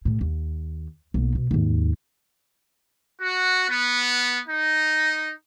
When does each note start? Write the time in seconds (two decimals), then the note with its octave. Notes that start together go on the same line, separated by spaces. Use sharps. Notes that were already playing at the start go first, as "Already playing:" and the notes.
0.05 A2 C3
0.21 D#2
1.14 B1 A#3
1.35 B2
1.51 D#2 G#2
3.20 F#4
3.68 B3
4.48 D#4